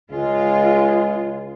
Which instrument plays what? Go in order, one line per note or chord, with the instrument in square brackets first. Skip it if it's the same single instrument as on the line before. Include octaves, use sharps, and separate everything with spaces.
[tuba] C#2 [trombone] G#3 [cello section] F4